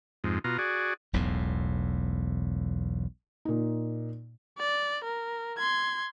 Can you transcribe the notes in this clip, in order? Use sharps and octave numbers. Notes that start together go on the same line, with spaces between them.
F2 G#2
B2 F4 A#5
F#4 G#4 D5
E1 B1 E2 A2
A#2 D#4
D5
A#4
C6 G#6